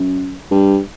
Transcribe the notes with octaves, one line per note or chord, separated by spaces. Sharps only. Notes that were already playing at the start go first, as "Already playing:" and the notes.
Already playing: F#2
G2